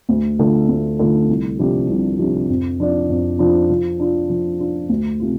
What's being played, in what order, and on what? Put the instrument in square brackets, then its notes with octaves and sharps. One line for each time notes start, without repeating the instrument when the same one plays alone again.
[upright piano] D2
D3 A3 F4 A4
D2
D3 A3 F4 A4
C2
C3 F3 D4 G4
C2
C3 F3 D4 G4
F2
F3 D4 F4 D5
F2
F3 D4 F4 D5
F3
D4 F4
F3
D4 F4
D2
C3 A3 F4